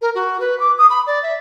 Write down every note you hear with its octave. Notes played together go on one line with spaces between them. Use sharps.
A#4
F#4
B4
D6
D#6
B5
D5
E5